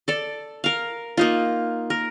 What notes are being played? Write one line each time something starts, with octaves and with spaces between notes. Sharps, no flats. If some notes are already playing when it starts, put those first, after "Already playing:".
A4 D5
A#4 F5
A#3 D#4 F4
A#4